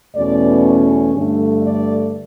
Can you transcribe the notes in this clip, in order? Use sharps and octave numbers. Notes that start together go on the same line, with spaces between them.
E2 B2 A3 C#4 D5
G2 D3 A3
D5